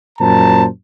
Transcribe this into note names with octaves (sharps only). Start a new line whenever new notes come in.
F#2 A#2 C5 A5 A#5